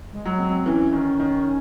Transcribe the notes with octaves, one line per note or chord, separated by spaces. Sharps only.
G#3
F#3
C4
E3 C#4
D#3
D#3